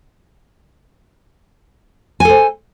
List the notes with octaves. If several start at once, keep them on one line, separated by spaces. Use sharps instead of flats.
A4 C5 G#5